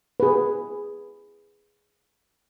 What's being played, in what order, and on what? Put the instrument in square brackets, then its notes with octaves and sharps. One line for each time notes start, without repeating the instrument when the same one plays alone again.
[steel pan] G#4 B4